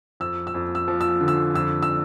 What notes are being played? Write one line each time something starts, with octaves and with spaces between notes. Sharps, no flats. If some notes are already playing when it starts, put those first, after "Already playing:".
F2 E6
E6
F2
E6
F3
E6
D3
E6
F2 E6
E6